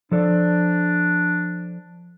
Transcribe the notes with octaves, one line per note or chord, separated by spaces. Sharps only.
F3 D4 A4 D5